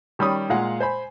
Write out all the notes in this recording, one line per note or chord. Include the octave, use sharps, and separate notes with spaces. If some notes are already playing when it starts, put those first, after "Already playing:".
D#3 G3 C#4 B5 D#6
A#2 G#3 F5 F#5
C5 G#5 B5